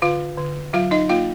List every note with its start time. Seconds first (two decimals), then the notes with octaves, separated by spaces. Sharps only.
0.02 D3 F4 F5
0.38 D3
0.73 F#3 F4 F5
0.91 D#4 D#5
1.09 A#3 F4 F5